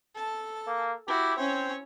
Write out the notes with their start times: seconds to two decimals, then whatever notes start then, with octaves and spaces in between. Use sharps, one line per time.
0.15 A4 A5
0.67 A#3
1.08 E4 F#4 G4
1.37 C4 C#4 C#5